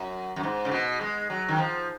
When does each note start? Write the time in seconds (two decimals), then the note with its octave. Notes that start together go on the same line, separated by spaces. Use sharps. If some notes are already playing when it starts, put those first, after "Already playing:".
Already playing: F#2
0.36 F#2
0.43 G#2
0.65 C#3
0.71 B2
1.01 G#3
1.30 F#3
1.48 D#3
1.58 F3